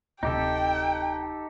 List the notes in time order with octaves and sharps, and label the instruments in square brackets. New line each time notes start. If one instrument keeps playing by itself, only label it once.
[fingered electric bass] D1 C3 [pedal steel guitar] D#4 G4 A4 [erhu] G5